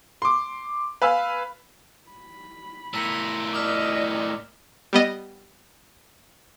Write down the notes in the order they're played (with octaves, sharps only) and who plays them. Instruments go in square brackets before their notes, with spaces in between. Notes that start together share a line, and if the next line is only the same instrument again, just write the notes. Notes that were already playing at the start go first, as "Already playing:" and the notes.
[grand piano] C6 D6
B4 F5 G#5 E6
[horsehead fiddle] B5
[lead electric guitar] A2 A#4 [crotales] E6 B6 C#7
[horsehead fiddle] D5 D#5 [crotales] D6 D#6 F6
[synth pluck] G3 B3 D#5